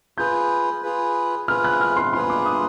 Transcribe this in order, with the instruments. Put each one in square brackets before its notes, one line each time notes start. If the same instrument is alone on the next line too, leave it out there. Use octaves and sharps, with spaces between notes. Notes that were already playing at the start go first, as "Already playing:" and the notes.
[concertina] F4 G#4 B4 [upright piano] G6
[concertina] F4 G#4 B4
[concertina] F4 G#4 B4 [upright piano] F6
[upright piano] F#6
F6
C6
[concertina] F4 G#4 B4 [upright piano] C6
[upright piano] D6
D#6